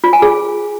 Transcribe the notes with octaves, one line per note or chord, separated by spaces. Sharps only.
F4
G#5
G#4